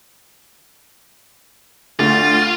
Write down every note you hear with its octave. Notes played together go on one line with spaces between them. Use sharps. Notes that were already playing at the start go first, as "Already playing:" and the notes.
D2 F4 A6